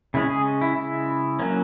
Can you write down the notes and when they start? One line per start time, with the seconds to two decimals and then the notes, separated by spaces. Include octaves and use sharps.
0.14 C#3 G#3 C#4 E4
0.30 G#4
0.61 E4
0.76 E4
1.39 F#3 A#3 C#4